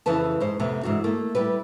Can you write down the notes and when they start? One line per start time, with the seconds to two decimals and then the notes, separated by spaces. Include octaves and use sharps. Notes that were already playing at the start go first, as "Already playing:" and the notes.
0.06 F2 C#3 E3 B4 A5
0.40 G#2 D#4 C5
0.59 F2 C3 A3 B3
0.83 G#2 E3 D4 F#4
1.04 A3 A#3
1.35 G3 E4 G4 B4